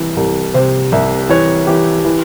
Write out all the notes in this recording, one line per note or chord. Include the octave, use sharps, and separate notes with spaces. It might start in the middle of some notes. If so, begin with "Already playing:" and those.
Already playing: C2 E3
C2
C3 C5
C2 E5
E3 C#5
E3 G4
E3